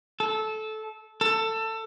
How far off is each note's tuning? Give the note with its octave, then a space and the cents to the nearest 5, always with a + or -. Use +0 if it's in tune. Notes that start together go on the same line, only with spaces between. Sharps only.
A4 -15
A4 +20